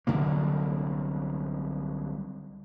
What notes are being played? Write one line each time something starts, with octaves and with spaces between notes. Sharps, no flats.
C2 D3 F#3 A#3